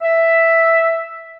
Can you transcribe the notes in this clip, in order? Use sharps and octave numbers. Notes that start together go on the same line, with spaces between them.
E5